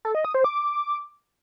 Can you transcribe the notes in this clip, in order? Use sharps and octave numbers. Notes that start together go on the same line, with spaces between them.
A4
D#5
D#6
C5
D6